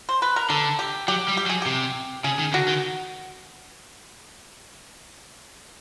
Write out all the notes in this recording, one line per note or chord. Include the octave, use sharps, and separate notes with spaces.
C5
B4
A#4
D3 A4
G4
F#3 G4
G3
G4
F#3
G#4
C3 G4
C#3 G#4
D#3
D3 F#4
D#3